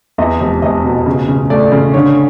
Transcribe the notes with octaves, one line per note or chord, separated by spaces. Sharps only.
E2 D#5
F1
F1 D#5
B2
C#3
C#3
A3 D5
C#3
D3 C#5